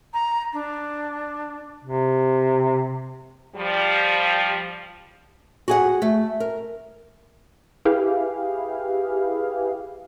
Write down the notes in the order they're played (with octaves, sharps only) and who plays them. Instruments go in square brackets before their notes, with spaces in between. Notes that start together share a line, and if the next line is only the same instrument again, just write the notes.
[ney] A#5
D4
[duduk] C3
[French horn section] F3 G3
[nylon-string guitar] F#4 G#4 F#5
A3
A#4
[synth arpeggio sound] E4 G4 G#4 B4 F5